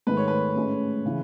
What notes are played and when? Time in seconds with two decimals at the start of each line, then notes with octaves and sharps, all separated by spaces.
0.07 G#2 D#3 A3 B4
0.17 C#5
0.28 B4
0.56 A2 G#3 C#4
1.05 C#3 E3